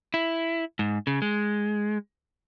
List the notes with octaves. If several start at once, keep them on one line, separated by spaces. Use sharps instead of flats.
E4
G#2
C#3
G#3